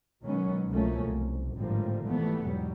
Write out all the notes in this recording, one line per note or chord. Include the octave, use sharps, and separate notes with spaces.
B2 D#3 F#3 G#3 B3 C#4
C2 B2 F3 A3 A#3 C#4
C2
G#1 A2 D3 F3 G3 A#3
B2 E3 G3 A3 B3
E2 G#2 B2 F#3 G3